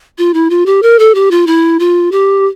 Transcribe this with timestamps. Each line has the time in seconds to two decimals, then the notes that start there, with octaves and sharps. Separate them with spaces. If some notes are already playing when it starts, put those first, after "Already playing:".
0.18 F4
0.34 E4
0.50 F4
0.66 G4
0.82 A#4
0.99 A4
1.15 G4
1.31 F4
1.47 E4
1.79 F4
2.12 G4